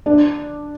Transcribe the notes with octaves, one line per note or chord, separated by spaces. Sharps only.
D4